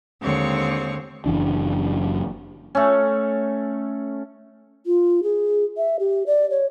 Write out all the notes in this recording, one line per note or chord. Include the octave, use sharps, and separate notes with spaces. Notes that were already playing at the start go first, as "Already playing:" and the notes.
D#2 D3 G#3 C4 C#5 C#6
F#1 F#2 E3 D4
A3 C#4
F4
G#4
E5
G4
D5
C#5